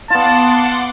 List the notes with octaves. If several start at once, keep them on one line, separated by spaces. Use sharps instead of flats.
B3 F4 F#5 A5 C6 D6